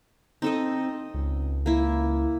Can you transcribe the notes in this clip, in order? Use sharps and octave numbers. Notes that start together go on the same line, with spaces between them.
C4 D#4 A4 D#5
C#2
A#3 E4